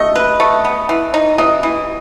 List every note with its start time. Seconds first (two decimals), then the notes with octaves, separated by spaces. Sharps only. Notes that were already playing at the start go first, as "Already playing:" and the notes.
Already playing: A3 D#5 D#6
0.15 B4
0.40 A3
0.65 B3
0.89 E3
1.14 D#4
1.38 E3 D#5 D#6
1.63 E3